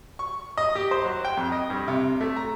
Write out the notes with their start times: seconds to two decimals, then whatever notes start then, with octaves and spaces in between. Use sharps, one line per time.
0.19 C#6
0.57 D#5
0.75 G4
0.91 C5
1.04 F#3
1.25 G5
1.37 F2
1.52 D#5
1.70 G2
1.88 C3
2.21 A3
2.36 A#5